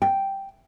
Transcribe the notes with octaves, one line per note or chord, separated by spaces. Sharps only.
G5